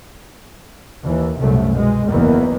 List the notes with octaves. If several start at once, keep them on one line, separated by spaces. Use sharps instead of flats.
D#2 E3
C2 F#2 C3 A3
B2 G#3
F#1 E2 D#3 E3 A#3 B3